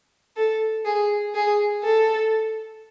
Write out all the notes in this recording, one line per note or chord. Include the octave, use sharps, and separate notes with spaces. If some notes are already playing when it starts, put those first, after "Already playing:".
A4
G#4
G#4
A4